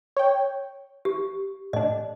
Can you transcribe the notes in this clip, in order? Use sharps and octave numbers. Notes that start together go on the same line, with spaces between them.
C#5 G5
G4
A2 D4 D#5